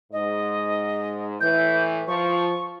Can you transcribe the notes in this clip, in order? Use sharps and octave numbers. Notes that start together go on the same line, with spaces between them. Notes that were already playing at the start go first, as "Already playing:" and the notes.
G#2 D#5
A2 E3 G6
F3 C#6